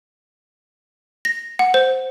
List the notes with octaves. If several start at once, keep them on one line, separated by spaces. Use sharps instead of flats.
A#6
F#5
C5